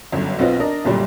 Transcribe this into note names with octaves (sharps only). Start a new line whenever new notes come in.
G1 F#2
B1 B3 C4 F4 D#5
D4 A#4 D#5
G1 F#2 A#2 G3